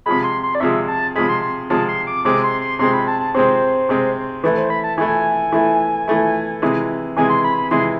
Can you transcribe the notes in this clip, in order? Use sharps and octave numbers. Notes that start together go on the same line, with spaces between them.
C3 F3 G#3 B5
C6
C6
D5
C3 F3 G#3 E5
A5
C3 F3 G#3 B5
C6
C6
C3 F3 G#3 A5
C6
D6
C3 G#3 C4 D6
C6
C6
C3 G#3 C4 C6
B5
A5
A5
C3 G#3 C4 C5
C3 G#3 C4
E3 A3 E4 B4
C5
B5
A5
E3 A3 E4 G#5
E3 A3 E4
E3 A3 E4
C3 E3 G#3
C3 E3 G#3 G#5
C6
B5
B5
C3 E3 G#3 C6